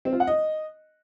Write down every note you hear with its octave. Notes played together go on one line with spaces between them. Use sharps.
C4
F4
F#5
D#5